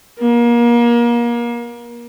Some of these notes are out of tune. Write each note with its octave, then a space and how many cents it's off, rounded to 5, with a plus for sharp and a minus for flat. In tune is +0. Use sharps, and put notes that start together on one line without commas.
A#3 +30